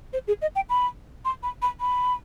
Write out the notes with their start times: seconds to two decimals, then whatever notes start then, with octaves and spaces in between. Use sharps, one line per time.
0.13 C5
0.28 G#4
0.42 D#5
0.55 G5
0.70 B5
1.25 C6
1.43 B5
1.62 B5
1.80 B5